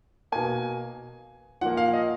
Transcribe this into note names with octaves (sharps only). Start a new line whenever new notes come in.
B2 A#3 G#5
A#2 F3 A#3 F#5
F5
D#5